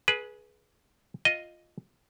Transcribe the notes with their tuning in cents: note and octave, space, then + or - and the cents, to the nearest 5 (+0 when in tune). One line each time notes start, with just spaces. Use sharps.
G#4 +20 B4 -15
F4 +0 D#5 +0